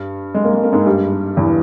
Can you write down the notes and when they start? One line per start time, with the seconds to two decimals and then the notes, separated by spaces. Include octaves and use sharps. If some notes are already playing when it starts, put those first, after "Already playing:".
Already playing: G2
0.34 G#3
0.45 A#3
0.53 G#3
0.64 A#3
0.72 G#2 G#3
0.86 G2 G3
1.37 E2 E3